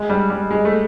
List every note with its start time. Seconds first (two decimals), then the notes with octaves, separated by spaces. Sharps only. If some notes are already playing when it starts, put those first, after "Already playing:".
Already playing: G#3
0.09 G3
0.30 G3
0.51 G#3
0.65 A3